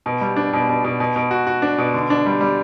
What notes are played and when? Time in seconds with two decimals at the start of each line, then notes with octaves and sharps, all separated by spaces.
0.06 B2
0.21 G3
0.36 D4
0.53 B2
0.69 B2
0.84 B2
1.00 B2
1.16 B2
1.31 F#4
1.47 F#4
1.62 D4
1.78 B2
1.94 D3
2.10 D4
2.26 G3
2.41 G3